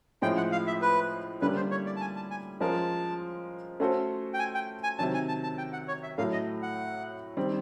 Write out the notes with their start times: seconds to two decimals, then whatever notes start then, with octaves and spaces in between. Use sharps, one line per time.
0.22 A2 F3 G#3 C#4 G5
0.37 F#5
0.52 F5
0.67 E5
0.82 B4
1.41 D3 G3 A#3 C#4 B4
1.56 C5
1.71 C#5
1.86 D5
1.96 A5
2.01 G#5
2.16 A5
2.31 G#5
2.60 F3 G#3 C#4 F4 A#4 A5
3.80 A3 C#4 F#4 A4 C5
4.34 G5
4.39 G#5
4.54 G5
4.83 G#5
4.99 C3 D#3 F#3 A5
5.14 G#5
5.28 A5
5.43 A5
5.58 G5
5.73 F#5
5.88 C#5
6.03 E5
6.18 A2 F#3 A3 F5
6.33 D#5
6.63 F#5
7.37 D#3 G3 C4